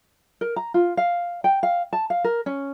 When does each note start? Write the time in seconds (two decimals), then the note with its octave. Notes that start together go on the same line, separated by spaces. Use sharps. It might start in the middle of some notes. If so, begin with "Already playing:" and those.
0.41 A#4
0.56 A#5
0.74 F4
0.97 F5
1.44 G5
1.63 F5
1.93 A5
2.10 F5
2.24 A#4
2.46 C#4